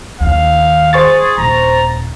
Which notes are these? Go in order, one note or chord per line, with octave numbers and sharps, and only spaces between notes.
D#2 D#3 F5
G#4 C5 C#6 A6
D#1 A#5